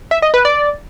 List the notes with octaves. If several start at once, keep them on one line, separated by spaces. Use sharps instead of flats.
E5
D#5
B4
D5